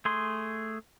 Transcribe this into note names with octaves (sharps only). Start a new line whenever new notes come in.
A3 G#4 C6